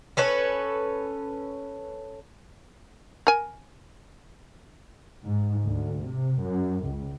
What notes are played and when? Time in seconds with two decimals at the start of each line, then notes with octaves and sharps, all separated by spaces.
0.17 C#4 A4 B4 C#5
3.27 A#4 G#5
5.25 G#2
5.65 D2
6.04 C3
6.42 F#2
6.85 C#2